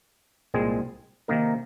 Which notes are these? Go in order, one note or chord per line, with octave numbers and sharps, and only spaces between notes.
C2 A#2 G#3 C4 G#4
C3 D#3 A#3 D#4 A#4